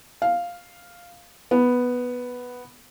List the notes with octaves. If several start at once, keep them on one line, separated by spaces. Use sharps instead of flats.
F5
B3